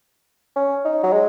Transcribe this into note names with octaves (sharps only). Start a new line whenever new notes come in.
C#4
D#4
F#3
G#3